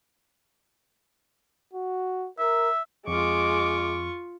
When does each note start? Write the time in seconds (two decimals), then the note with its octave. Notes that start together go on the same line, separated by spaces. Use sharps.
1.74 F#4
2.39 A#4 E5
3.08 F2 G#3 F4 C#6 D6